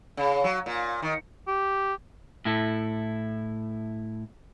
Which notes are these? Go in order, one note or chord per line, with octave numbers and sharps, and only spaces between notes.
C#3
F#3
A#2
D#3
G4
A2 E4 A4